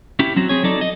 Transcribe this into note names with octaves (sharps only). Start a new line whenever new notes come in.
C#4 E4 G4
F#3 C4 F#4
C4 G#4 C#5
F#3 D#4 A4 D5
D#5